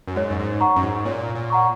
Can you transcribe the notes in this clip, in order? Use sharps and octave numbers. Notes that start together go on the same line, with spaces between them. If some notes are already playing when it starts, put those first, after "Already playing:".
F#2
G#2 C#5
F#2
G#2
F#5 A#5 C#6
F#2
G#2
A#2 C#5
A#2
F#5 A#5 C#6